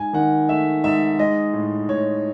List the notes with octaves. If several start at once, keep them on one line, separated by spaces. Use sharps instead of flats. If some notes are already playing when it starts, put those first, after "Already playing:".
Already playing: G#2 G#5
D#3 F#5
A3 E5
G#2 E5
G#3 D#5
A2
A2 C#5